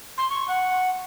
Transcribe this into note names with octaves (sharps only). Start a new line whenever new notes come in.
C6
C#6
F#5